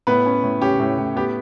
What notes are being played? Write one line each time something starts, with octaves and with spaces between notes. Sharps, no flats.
A2 B3 B4
C#4
A2
C#4 G4
A2
A2
B3 G4